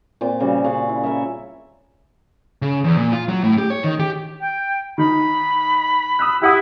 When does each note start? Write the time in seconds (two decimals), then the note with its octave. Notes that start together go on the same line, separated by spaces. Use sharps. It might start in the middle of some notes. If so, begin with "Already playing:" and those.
0.21 A#2 C4 D6
0.40 C#3 G3 F#4
0.64 C#3 F5 F#5
0.89 E4
1.03 E4 A#4 C#5 E5
2.62 C#3
2.84 E2
2.97 A#2
3.13 F4
3.29 F#3
3.44 A2
3.58 G4
3.70 C#5
3.84 D#3
4.00 G4
4.40 G5
4.98 D#3 D#4 B5
6.19 D#6 E6 F#6
6.42 E4 G4 F#5 D#6